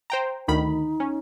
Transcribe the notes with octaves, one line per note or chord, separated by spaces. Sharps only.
C5 G5 A#5
D2 D#3 D#4 B5
C#4